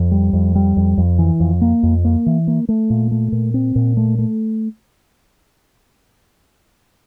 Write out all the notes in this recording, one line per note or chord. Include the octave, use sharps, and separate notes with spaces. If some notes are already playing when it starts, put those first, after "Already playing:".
Already playing: F2
G3
F2
G3
F2
F2
E3
F2
A#3
F2
A#3
E3
A#3
A3
A#2
A3
A#2
C4
A#2
A3
A3